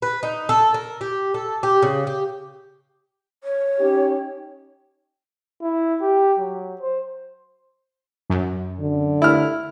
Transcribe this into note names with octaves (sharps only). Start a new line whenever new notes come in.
B4
D#4
A4
A#4
G4
A4
G4
C#3
G4
C#5
C#4 D#4 G4
E4
G4
F#3
C5
F#2
D3
E4 F6